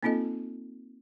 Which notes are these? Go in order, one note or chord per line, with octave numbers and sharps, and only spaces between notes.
A#3 C4 D#4 F4 A4 D#5